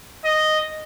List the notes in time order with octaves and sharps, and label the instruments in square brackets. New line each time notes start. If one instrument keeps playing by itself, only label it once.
[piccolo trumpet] D#5